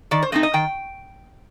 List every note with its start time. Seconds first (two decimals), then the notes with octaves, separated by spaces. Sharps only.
0.11 D#3 D5
0.22 C5
0.32 A3 C4 D#4 D#5
0.43 D#5
0.53 D#3 G5